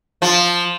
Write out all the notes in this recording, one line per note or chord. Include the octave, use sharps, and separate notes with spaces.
F3